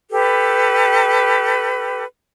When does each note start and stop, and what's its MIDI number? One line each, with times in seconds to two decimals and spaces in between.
0.11 2.04 67
0.11 2.04 69
0.11 2.04 71